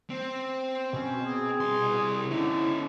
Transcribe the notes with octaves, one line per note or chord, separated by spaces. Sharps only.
C4
B2 C#4
G#4
C2 C6
D3 C#4 D#4 E4